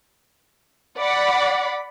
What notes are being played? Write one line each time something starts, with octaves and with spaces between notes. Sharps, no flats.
D5 F#5 B5